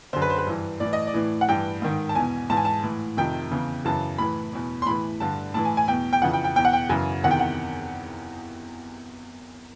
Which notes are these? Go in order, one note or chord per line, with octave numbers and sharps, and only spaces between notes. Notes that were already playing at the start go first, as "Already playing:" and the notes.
F#2 D3 C5
B4
C5
B4
G2 E3
A2 E3 D5
D#5
D5
A2 E3
F#5
G2 E3 G5
G#2 D#3
A5
E2 B2 G#5
G#2 E3 A5
G#5
A5
A2 E3
F2 C3 D#3 G5
E2 C#3 E3
F#2 C#3 E3 A5
A2 E3 B5
E2 B2
C6
A2 E3 B5
G2 D3 A5
A2 E3 A5
G#5
G#5
E2 B2 G5
G5
F2 C#3 E3 F#5
G5
G5
E2 B2 G5
F#5
G5
F#2 C#3 E3 G#5
E2 C3 D#3 F#5
G5
F#5